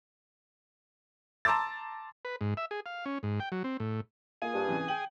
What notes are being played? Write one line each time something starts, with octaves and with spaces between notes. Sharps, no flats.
A5 A#5 C6 D6 E6 A6
B4
G#2
E5
G#4
F5
C#4
G#2
G5
F#3
C4
A2
A#3 F4 G#4 F5 G#5 D#6
G2
C3 E3 C#4
G5 F#7